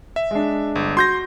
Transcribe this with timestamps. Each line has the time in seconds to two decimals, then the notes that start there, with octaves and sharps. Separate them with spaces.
0.16 E5
0.31 G#3 D4
0.76 G1
0.97 F#4 C6 G6 A#6